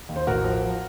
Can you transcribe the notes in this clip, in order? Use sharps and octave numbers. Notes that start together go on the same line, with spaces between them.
D#2
C5
A1 F#4 A#4
F3
F3